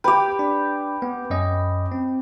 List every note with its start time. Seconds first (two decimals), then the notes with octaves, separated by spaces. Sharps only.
0.04 G4 B4 G5 D6
0.39 D4
1.02 B3
1.30 F#2 C#4 D#5
1.92 C4